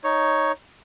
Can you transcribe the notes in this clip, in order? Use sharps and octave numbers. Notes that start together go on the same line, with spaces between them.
D#4 C#5